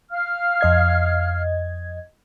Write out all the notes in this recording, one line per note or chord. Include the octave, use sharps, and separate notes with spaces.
F5 F6
F2 D#5 G#6